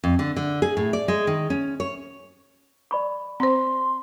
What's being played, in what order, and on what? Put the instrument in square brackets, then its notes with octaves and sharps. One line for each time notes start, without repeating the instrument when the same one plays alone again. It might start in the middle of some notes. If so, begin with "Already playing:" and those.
[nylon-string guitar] F2
D3
D3
G#4
A2
D5
G#3
D#3
C#4
C#5
[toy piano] D5 B5 C#6
[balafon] C4 C5 [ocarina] C6